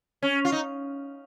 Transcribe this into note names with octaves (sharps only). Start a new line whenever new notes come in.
C#4
F4
D#4